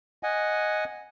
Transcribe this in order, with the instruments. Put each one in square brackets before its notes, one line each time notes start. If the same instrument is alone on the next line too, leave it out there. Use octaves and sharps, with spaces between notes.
[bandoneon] D#5 F#5 G#5